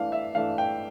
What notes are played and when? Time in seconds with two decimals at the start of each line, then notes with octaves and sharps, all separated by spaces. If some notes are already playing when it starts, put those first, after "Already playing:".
Already playing: E3 A3 D4 F5
0.12 E5
0.35 E3 A3 D4 F5
0.58 G5